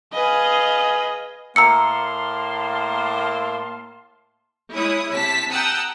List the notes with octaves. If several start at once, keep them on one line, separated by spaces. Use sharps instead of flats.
G#4 B4 D#5 F5 G#5
A2 A#3 F5 A5 A#5 C6 E6 C#7
G#3 E4 C#5 D#6
C3 A5 B6
F#5 G5 A5 A#5 D#6 E6